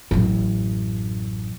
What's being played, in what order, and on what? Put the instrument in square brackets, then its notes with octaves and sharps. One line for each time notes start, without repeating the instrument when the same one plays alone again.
[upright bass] A1 F#2